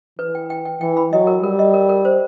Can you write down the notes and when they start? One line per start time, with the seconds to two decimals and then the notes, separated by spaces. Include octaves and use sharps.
0.19 E3 B4
0.35 G5
0.50 G5
0.65 G5
0.81 E3 G5
0.97 B5
1.12 F#3 D#5
1.27 A#4
1.43 G3 A#4
1.59 D#5
1.74 A#4
1.89 A#4
2.05 C5